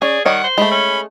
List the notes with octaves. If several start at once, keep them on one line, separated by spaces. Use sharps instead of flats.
C#4 G#4 D5
D#3 G3 C#5 D#5 F#5
C5
G#3 A3 B5
C#4